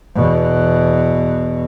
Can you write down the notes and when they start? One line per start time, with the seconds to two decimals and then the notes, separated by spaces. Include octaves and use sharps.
0.15 E2 B2